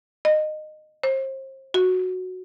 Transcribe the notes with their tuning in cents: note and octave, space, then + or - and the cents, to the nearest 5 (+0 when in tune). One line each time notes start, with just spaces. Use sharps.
D#5 -20
C5 +35
F#4 -5